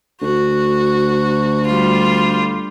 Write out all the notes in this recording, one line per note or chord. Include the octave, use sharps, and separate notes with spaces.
D2 F#4
G3 F4